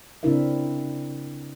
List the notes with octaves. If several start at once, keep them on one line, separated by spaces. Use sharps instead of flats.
C#3 C4 D4 E4 A#4 E5